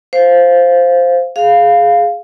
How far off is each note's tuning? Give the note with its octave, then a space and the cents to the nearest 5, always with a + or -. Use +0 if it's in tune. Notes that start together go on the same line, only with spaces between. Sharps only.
C5 +0 F5 +0
G#4 +10 F5 +0